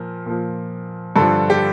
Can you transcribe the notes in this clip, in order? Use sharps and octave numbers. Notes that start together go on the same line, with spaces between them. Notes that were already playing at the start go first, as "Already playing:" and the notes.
Already playing: A#2 F3 A#4
A#2 F3
G2 D3 F3 A4
G4